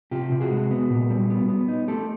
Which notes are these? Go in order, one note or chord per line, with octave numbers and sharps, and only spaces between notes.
C3 F4 G4
C3
F#4 G#4
G#3
B3
A#2
G3
B3
B3
D#4
A3 G4 A4